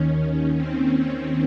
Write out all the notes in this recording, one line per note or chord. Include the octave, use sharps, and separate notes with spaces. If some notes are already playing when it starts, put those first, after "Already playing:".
Already playing: D#2 D#3 C#4
C4